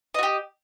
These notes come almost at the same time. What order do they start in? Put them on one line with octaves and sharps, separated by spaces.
D#5 F#4 G4